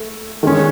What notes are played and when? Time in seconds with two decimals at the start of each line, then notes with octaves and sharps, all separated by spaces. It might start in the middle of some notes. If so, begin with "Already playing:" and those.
Already playing: A3
0.43 D#3 G#3 C#4